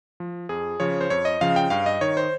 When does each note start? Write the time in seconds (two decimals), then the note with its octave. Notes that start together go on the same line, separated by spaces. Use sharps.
0.20 F3
0.49 F2 G#4
0.80 C#3 F3 C#5
1.01 C5
1.10 F2 C#5
1.25 D#5
1.41 C#3 F3 F5
1.56 G5
1.70 G2 F5
1.86 D#5
2.01 D#3 C#5
2.17 C5